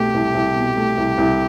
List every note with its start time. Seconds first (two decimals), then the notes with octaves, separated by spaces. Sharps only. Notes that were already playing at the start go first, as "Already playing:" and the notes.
Already playing: C2 B2 A3 G4
0.14 C2
0.35 C2
0.56 B2
0.77 A3
0.98 C2
1.18 C2